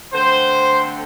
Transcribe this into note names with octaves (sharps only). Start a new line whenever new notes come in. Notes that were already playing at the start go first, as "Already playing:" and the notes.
D3 A3 C4 C5